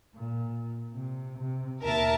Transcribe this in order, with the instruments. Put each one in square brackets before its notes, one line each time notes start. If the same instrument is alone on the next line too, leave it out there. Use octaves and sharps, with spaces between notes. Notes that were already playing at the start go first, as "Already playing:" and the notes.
[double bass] A#2
C3
C3
[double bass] D#2 B2 [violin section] A#4 E5 A5